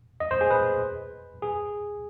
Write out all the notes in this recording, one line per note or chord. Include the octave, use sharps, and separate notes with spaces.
D#5
C5
G#4
B4
G#4